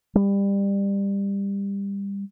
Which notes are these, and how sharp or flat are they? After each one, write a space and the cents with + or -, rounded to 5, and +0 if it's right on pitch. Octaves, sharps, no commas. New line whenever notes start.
G3 +25